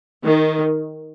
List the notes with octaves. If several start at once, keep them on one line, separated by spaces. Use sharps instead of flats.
D#3